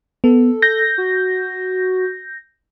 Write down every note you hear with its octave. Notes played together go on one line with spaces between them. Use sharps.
B3 A4
G6 A#6
F#4